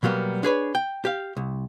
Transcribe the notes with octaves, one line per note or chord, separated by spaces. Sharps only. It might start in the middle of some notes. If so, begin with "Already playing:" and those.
B2 F#3 G3 A#3 B3
D4 G#4 B4 C#5
G5
G4 F5
C2